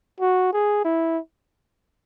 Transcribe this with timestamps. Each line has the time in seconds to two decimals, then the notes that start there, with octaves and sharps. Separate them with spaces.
0.20 F#4
0.53 G#4
0.85 E4